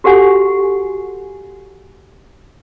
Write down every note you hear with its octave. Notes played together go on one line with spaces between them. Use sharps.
F#4 G4 A4 F#5 G#5